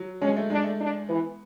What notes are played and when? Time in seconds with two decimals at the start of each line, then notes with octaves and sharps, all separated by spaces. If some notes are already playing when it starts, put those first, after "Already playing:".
Already playing: F#3
0.22 G#3 C#4
0.37 A3
0.50 G#3 D4
0.64 A3
0.80 D4
1.09 E3 B3